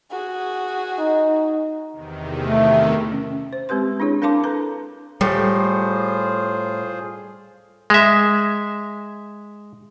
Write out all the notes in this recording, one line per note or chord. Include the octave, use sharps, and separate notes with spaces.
F#4 G#4
D#4
E2 C3 D#3
A3
C#4
C5
G#3 C4 G4 B4 C6
D4 E4 G#4 C#5
D4 A#4 F5 A5 C6 D6
A4 B4 A#5
A2 G3 F4 G#4 C5
G#3 E5